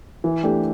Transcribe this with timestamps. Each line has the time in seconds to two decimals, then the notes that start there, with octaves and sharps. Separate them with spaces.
0.24 E3
0.43 A3 D4 G4